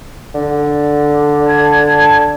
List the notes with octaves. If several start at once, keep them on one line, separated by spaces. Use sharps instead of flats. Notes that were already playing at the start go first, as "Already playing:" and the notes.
D3
A5 G#6